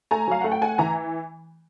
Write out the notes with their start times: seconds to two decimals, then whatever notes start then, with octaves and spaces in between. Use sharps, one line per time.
0.11 A3 G#5 A#5
0.28 F#3 F5
0.41 A3 F#5
0.52 G5
0.62 A3 F#5 G#5
0.78 E3 G#5 A#5